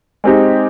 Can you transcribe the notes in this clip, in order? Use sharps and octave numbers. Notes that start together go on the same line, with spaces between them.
G#3 C4 D#4 G4